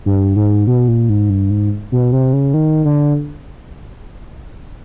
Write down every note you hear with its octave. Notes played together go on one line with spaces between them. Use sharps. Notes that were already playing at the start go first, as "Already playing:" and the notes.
G2
G#2
B2
A#2
G#2
G2
G#2
B2
C3
C#3
D#3
D3